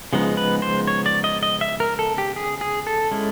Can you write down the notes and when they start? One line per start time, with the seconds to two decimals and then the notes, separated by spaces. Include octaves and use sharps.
0.13 C#3 F3 G#3 B3 D#4
0.37 B4
0.62 C5
0.87 C#5
1.06 D5
1.24 D#5
1.43 D#5
1.61 E5
1.80 A#4
1.99 A4
2.18 G4
2.36 G#4
2.61 G#4
2.87 A4
3.11 G#3 C#4 E4